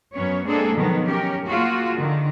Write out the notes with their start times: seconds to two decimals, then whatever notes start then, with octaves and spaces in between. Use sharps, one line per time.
0.13 F#2 F#3 B3 C#4 C#5
0.44 G#3 A#3 C4 D4 G#4 A4
0.74 B2 D#3 F3 F#3 B3
1.06 C#4 G4 A#4
1.45 A#3 F4 F#4 G#4
1.95 D3 D#3